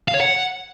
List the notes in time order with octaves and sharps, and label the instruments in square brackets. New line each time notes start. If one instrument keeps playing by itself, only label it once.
[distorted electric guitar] F5
C#5
F#5